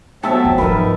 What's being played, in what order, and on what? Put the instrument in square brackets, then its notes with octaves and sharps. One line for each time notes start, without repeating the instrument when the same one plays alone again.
[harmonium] F#3 A3 C4 [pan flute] B3 [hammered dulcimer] E5 A5
[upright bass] E2
[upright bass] G#2 F3 [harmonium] D#4 [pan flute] A#4 [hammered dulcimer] B4